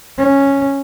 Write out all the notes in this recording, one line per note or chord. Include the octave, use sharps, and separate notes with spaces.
C#4